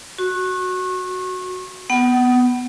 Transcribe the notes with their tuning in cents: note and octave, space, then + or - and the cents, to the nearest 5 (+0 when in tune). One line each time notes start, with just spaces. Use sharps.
F#4 +0 C#6 -30
B3 +0 F#5 +35